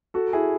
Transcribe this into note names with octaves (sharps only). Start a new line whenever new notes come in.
F#4 A4
E4 G#4